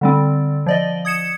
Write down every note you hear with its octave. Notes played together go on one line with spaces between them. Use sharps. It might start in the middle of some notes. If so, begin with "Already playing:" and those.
D3 G3 C4
F3 D5 D#5
D#6 G#6 C#7 E7